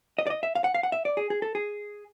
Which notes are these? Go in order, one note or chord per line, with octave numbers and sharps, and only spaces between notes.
D#5
D5
D#5
E5
F5
F#5
F5
F#5
E5
D5
G#4
G#4
A4
G#4